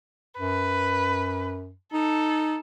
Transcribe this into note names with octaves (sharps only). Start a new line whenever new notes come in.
F#2 B4
D#4 A4